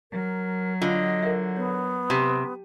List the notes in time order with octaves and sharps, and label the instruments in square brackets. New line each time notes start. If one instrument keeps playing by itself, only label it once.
[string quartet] F#3 [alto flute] A#4
[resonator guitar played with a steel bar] D3 [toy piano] F4 F5 [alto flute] D#5
[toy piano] A4 A#4 E5
[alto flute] B3 [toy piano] C#5
[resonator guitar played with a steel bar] C3 [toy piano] G4 C6